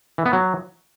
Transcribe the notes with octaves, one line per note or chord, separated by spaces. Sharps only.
E3
B3
F#3